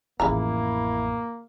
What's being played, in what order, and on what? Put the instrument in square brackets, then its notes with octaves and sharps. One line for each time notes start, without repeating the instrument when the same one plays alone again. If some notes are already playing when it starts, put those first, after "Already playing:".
[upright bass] A1 F2 [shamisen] C#3 F4 A#5 [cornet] A#3 [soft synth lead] E4